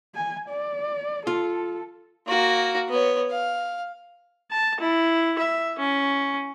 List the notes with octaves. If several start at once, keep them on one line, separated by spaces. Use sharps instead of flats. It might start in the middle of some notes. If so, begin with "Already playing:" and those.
G#5
D5
F4 A4
A#3 F#4
B3 C#5
F5
A5
E4
E5
C#4